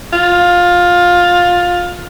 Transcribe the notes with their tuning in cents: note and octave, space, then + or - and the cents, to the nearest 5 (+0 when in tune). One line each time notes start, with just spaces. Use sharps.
F4 +15